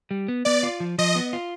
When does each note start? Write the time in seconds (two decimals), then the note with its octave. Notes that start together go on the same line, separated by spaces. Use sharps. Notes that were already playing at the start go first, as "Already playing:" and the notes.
0.11 G3
0.28 B3
0.45 B3 D5
0.63 F4
0.80 F3
0.98 F3 D#5
1.15 B3
1.33 F4